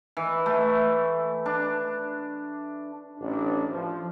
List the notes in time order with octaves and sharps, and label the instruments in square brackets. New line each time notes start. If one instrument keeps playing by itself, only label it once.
[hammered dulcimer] E3
A3
D4
[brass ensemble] A1 D4
F3